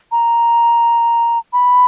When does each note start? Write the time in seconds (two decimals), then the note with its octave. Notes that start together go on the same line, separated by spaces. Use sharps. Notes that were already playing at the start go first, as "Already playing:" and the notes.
0.12 A#5
1.53 B5